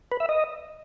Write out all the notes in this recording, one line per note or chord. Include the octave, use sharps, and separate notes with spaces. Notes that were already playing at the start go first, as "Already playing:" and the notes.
B4
E5
D#5